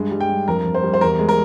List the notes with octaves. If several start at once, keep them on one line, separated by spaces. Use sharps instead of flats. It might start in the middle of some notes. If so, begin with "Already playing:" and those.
Already playing: G2 G#3
G3
G5
G2
F2 A#4
F2
C5
G3
C5
E2 A#4
G#3
A#4